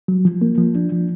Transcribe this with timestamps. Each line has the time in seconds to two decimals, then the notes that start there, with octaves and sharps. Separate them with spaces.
0.08 F#3
0.25 F3
0.42 A#3
0.58 F3
0.75 D4
0.92 F3